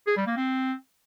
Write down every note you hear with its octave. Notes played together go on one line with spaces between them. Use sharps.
G#4
G3
A#3
C4